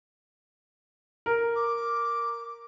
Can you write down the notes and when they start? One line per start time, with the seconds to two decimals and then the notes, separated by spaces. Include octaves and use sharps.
1.26 A#4
1.56 D6